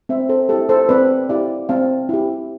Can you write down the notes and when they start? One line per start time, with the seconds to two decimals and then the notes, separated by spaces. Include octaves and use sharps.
0.09 C4 C5 E5
0.29 A4 C5
0.49 E4 G4 A4
0.69 A4 C5
0.89 C4 B4 D5
1.29 E4 G4 D5 F5
1.69 C4 F5 A5
2.09 E4 G4